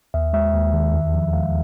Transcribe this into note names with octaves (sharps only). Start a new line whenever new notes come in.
D#2 E5
G#3 E5
D#2
D#3
E2
F3
G#3 F5